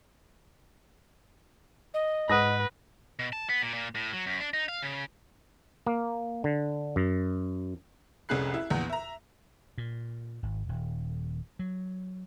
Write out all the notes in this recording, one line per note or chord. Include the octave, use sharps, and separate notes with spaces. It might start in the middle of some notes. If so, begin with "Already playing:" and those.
D#5
G#2 B4 F#5 D#6 A#6
B2
A5
B3
A#2
A#2
A2
F#3
F#2
D4
D#4
F5
C#3
A#3
D3
F#2
F1 C2 C#4 G#4 F#6 C7
E4
A#1 E2
E5 A#5
A#2
G#1
D#1
F#3